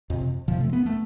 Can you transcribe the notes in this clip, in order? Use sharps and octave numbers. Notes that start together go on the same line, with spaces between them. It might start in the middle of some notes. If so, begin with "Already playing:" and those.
F2 C3
F2 C3 F3
A3
B3
A3